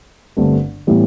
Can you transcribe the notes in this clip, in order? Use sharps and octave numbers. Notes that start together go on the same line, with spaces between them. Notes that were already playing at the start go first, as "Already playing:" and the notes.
G1 G2 D3 A3 C4
A2 E3 G3 B3